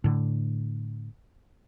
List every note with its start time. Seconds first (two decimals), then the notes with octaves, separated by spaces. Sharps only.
0.04 A2 D3